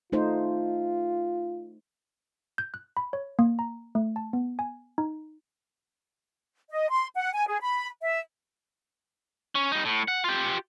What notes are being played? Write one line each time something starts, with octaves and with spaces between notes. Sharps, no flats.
A3 D#4 F4 C5
G6
F#6
B5
C#5
A#3
A#5
A3
A5
B3
G#5
D#4
D#5
C6
F#5
G#5
G#4
B5
E5
C#4
G3 D#4
A2
F#5
F4 G4